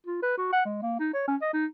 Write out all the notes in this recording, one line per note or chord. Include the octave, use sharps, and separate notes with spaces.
F4
B4
F#4
F#5
G#3
A#3
D#4
C#5
C#4
D#5
D#4